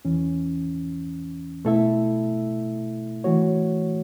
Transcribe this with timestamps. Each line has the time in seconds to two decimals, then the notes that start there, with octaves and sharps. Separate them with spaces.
0.05 E2 E3 C#4
1.65 B2 A3 E4 A4 E5
3.24 E3 A3 F#4 C#5